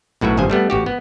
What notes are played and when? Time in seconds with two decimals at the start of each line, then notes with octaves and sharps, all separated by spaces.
0.21 B1 A2 F#4 B4 E5
0.37 G#1 G2 G#4 C5 G#5
0.50 G3 A3 B3
0.70 A1 F#4 G4
0.86 B3